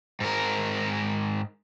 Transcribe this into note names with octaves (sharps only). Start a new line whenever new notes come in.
G#2 A#4